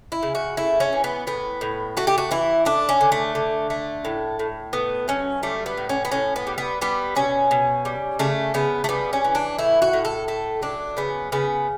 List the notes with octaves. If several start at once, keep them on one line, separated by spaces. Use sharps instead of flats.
E4
C#3
F#4
A3 E4
C#4
E3
B3
A2 B3
A2
A3 F#4
G4
F#4
E3 E4
A3 D4
C#4
D3
A3
D3
A3
A2
A2
A3 B3
F#3 C#4
G3 A3
B3
A2
C#4
B3
A2 C#4
B3
G3
B3
G3 B3
B2 C#4
B2
G3
C#3 A3
C#3 B3
A3
G3 B3
C#4
E3
D4
A2 E4
F#4
A2
A4
A3 A4
F#3 D4
C#3 B3
C#3 B3